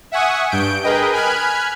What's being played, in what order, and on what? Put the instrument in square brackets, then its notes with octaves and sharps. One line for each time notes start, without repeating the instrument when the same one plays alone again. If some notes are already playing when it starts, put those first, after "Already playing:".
[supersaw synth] E5 F#5 G#5 C#6 D#6
G2 G6 D7
G#4 A#4 B4 D#5 G5
G#5 B5 F6 F#6 G#6